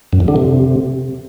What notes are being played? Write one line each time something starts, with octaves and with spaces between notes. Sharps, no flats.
F#2
F2
D3
C3